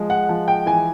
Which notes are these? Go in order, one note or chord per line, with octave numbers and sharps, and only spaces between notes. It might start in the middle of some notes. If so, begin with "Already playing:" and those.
Already playing: F3 G#3
F#5
F3
G5
E3 G#5